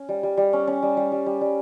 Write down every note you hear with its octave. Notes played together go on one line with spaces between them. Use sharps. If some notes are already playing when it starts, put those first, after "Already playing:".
Already playing: C#4
G3
G3
G3
C#4
C#4
G3
G3
G3
G3
G3